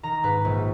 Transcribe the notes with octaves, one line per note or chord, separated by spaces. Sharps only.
D#3 A#5
G#2 B4
A#1